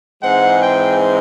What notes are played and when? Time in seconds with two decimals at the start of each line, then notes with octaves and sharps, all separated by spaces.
0.22 G#2 E3 G#3 C4 F#5
0.62 G5